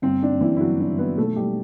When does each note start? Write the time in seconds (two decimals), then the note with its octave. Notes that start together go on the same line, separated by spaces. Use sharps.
0.02 G1 C4
0.23 D4
0.32 F#2
0.41 E3 E4
0.56 E4
0.60 G1 F#3 F#4
0.80 D4
0.89 G1
0.98 B3 B4
1.17 B1 A3 A4
1.36 G3 G4